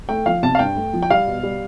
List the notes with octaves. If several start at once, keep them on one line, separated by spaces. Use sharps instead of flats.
A3 G5
F3 F5
C3 A5
F5
G2 G5
A3
F3
G5
G3 F5
B2
G3